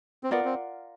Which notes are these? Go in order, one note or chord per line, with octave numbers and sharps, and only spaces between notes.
C4
B3 F4 A#4 D5 F#5
C4